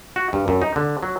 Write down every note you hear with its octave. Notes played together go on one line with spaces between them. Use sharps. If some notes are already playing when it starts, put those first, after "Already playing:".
F#4
G2
F#2
D#4
D3
F#3